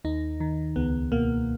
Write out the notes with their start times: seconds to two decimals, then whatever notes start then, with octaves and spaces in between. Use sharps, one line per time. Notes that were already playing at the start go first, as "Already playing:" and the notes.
0.04 D#2 D#4
0.40 D#3
0.76 C#2 B3
1.12 B2 A#3